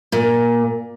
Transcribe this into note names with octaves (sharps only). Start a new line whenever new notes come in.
A#2